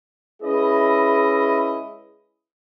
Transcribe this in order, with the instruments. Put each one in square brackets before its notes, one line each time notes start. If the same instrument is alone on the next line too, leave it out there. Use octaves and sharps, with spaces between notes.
[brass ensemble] G#3 C#4 E4 G#4 B4 D#5